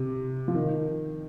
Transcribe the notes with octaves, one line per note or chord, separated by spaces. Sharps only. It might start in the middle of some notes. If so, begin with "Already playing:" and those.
Already playing: C3
F3
D#3